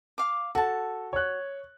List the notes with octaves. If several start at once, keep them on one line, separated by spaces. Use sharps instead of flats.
F5 D6
F#4 A4 A5
C#5 F#6